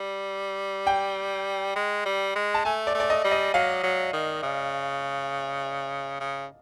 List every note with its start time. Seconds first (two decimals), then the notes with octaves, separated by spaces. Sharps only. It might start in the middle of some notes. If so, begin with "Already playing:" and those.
Already playing: G3
0.87 G5
1.76 G#3
2.06 G3
2.35 G#3
2.54 A5
2.65 A3 G#5
2.87 D5
2.95 A3
3.00 D5
3.10 D#5
3.24 G3
3.31 D#5
3.54 F#3 F5
3.83 F#3
4.13 D#3
4.43 C#3
6.20 C#3